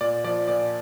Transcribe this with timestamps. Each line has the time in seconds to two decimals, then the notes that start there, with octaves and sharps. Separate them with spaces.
0.01 A#2 D5
0.24 F3 D5
0.48 A#2 D5